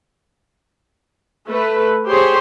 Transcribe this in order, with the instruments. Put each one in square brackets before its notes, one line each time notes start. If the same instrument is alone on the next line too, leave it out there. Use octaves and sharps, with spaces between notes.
[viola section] A3 B4
G4 G#4 C5 C#5 C6